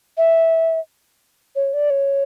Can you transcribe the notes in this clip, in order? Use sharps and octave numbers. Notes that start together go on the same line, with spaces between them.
E5
C#5
D5
C#5